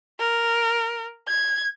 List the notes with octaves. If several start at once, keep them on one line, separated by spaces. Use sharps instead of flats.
A#4
G#6